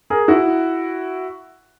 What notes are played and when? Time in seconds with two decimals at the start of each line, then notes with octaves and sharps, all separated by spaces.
0.10 G#4 A#4
0.28 E4 F#4